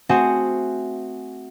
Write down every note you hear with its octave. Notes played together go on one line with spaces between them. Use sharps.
A3 C4 F#4 G#4 F#5 G#5